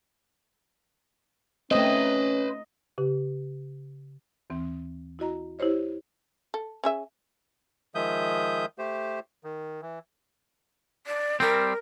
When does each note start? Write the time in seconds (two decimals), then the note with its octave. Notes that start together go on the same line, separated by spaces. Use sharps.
1.71 A3 C4 C#4 B4 C5 D#5
2.98 C#3 G4
4.50 D#2 E3 C4
5.19 E4 F#4 D#5 A#5
5.59 E4 G4 C5 C#5 D#5
6.54 A4
6.84 C#4 G#4 E5
7.95 D#3 F3 G#3 E5 D#6 G6
8.78 A3 G4 C5
9.44 D#3
9.82 E3
11.06 D5
11.40 G3 C4 A#4